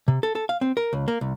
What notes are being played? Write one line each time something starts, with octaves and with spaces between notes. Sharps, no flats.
C3
A4
A4
F5
C4
A#4
C#2
A#3
C2